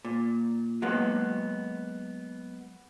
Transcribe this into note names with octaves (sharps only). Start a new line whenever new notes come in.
A#2
F#3 G#3 A#3 B3